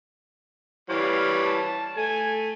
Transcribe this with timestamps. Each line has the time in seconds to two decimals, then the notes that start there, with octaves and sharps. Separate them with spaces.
0.90 E3 G3 C#5 F5
1.46 A5
1.97 A3 G#5